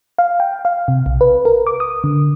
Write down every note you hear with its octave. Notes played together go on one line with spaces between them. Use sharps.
F5
G5
F5
C3
B1
B4
A#4
D6
D#6
D3